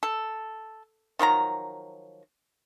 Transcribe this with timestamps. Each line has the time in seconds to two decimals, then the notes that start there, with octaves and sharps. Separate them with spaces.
0.03 A4
1.19 D#3 F3 F#3 A#5